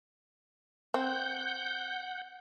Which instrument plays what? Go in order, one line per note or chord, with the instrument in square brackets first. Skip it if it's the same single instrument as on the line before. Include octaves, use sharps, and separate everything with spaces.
[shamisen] C4 [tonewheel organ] F#5 G6